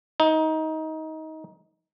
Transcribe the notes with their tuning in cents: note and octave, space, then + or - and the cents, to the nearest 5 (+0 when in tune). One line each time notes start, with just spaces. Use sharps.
D#4 +20